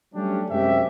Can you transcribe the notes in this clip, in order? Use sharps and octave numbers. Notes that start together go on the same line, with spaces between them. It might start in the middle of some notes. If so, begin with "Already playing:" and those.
F#3 G3 A3 C#4 D4 G4
F#2 C3 G#3 C#4 G4 E5